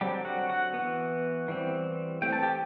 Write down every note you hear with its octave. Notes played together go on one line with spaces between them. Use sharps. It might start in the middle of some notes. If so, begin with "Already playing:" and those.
D3 F#3 G3 C4 G4
F#4 F#5
F#4 F#5
E3 B3
E3 G3 C4
E3 A3 C4 G5
A5
G4 G5